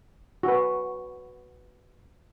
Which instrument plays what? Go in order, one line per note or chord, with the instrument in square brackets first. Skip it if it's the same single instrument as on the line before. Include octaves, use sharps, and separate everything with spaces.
[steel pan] F#4 B4